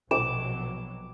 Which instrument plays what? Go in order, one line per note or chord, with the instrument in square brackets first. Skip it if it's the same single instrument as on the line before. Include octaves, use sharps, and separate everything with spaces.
[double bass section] A#1 B2 F#3 [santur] D6 [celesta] E7